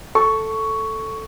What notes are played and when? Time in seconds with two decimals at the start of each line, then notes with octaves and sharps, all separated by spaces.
0.15 A4 C#6